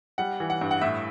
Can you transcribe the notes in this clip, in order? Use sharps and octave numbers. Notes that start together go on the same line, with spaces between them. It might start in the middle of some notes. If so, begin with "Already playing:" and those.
G3 F#5
E3
F#5
G2
F#5
A2 E5